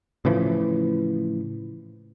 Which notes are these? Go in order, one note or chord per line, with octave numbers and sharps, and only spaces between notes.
A2 C#3 E3 F3